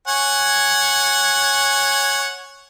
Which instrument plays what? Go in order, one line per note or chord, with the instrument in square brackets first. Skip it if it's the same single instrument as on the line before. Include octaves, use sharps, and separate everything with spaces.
[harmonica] C#5 F#5 G#5